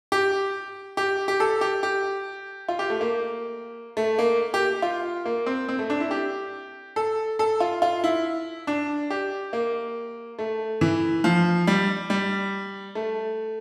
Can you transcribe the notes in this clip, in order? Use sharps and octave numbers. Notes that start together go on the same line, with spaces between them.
G4
G4
G4
A4
G4
G4
F4
G4
A3
A#3
A3
A#3
G4
F4
A#3
C4
C4
A3
D4
E4
G4
A4
A4
F4
F4
E4
D4
G4
A#3
A3
E3
F3
G3
G3
A3